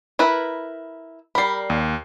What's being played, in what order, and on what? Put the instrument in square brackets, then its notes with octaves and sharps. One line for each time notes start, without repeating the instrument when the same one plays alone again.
[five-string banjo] E4 A#4 B4
[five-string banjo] G3 A#4 [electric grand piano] B5 C7
[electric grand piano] D#2